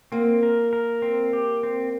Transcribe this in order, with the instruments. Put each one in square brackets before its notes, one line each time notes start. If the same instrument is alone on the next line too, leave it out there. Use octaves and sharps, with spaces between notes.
[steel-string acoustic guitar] A#3 [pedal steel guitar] C4
[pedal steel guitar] A#4
A#4
C4
G4
C4